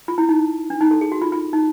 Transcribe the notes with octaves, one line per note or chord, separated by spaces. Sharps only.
F4
E4
D#4
D4
D#4
A4
G#4
F#4
F4
F4
D#4